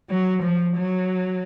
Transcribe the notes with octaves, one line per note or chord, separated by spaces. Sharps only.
F#3
F3
F#3